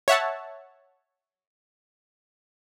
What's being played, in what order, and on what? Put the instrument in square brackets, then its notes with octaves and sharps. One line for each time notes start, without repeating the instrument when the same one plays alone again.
[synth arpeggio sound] C#5 E5 F#5 A5